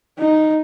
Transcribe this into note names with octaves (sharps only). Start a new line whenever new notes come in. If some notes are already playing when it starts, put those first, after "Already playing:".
D#4